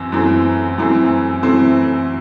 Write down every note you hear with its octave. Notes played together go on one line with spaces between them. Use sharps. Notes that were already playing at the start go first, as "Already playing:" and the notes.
Already playing: F#2 E3 C4
F#2 E3 A3 C4
F#2 E3 A3 C4
F#2 E3 A3 C4